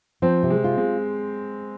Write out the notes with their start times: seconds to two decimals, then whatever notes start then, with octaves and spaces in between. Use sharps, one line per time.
0.22 F3 C4
0.43 C3
0.50 G#3
0.64 F4
0.78 G#3